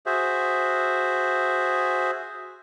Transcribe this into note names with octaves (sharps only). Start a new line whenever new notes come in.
F#4 G#4 C5 E5